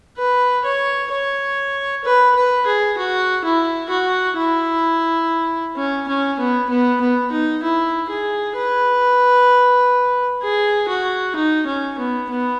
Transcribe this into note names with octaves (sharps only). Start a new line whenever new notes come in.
B4
C#5
C#5
B4
B4
G#4
F#4
E4
F#4
E4
C#4
C#4
B3
B3
B3
D#4
E4
G#4
B4
G#4
F#4
D#4
C#4
B3
B3